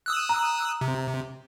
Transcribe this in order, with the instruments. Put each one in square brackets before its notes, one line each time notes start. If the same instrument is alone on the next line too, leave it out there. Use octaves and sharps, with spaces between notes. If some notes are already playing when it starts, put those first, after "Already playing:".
[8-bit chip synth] D#6 E6 F#6
[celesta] A#5
[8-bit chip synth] C3